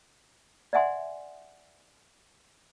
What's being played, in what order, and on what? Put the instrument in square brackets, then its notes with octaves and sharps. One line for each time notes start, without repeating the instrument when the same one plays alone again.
[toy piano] D5 E5 F#5 G#5 C6